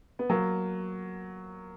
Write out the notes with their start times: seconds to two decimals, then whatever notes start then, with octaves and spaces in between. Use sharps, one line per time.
0.19 B3
0.30 F#3 A#3